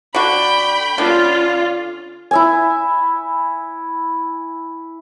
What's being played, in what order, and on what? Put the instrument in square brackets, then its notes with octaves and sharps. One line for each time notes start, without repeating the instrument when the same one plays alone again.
[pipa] D3 F#4 [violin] G5 B5
[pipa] D3 [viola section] C#4 F4
[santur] E4 E5 G#5